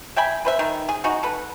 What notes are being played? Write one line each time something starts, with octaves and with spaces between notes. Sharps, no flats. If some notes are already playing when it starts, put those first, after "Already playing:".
E5 G5 G#5 B5
B4 C5 E5
D#3
G#4
D#4 F#4 G#4
A4 B4 F#5